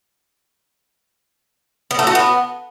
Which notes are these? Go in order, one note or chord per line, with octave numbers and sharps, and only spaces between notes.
B3
A3
F#4
B3